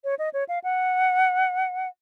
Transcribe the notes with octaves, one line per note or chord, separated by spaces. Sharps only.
C#5
D#5
C#5
F5
F#5